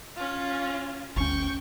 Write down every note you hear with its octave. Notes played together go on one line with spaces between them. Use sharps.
C#4 F4
G1 D2 C#4 G5 C#6